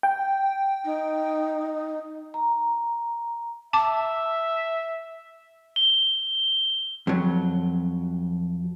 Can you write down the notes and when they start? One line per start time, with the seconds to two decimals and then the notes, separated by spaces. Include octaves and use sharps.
0.03 G5
0.85 D#4
2.34 A#5
3.73 E5 A5 D6
5.76 G7
7.07 F2 F#3